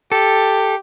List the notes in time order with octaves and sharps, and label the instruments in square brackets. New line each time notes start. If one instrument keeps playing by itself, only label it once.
[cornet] G4 [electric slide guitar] A4